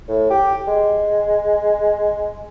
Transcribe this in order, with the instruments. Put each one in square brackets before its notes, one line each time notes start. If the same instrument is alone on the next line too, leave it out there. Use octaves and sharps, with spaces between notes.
[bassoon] A2
G4
G#3